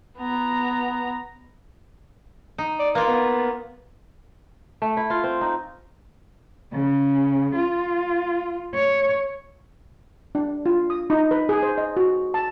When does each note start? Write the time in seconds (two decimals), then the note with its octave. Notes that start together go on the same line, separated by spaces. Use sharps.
0.18 B3 A#5
2.58 D#4
2.80 D5
2.95 A#3 F4 B4
3.08 B3
4.82 A3
4.97 E4
5.10 F4
5.24 C4
5.41 D#4
6.73 C#3
7.55 F4
8.75 C#5
10.35 D4
10.66 F4
10.90 D#6
11.10 D#4
11.31 B4
11.49 G#4
11.63 C5
11.78 D#5
11.97 F#4
12.34 A5